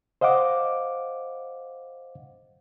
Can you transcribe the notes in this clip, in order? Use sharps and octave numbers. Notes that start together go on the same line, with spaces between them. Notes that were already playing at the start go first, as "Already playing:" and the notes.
C5 D#5 F5 F#5 D6